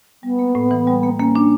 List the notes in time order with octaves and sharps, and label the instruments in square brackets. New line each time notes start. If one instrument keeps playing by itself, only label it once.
[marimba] G3 [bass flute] B3
[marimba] A#3
A2
E3
G3
A#3
[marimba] A#3 [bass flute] C#4
[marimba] D4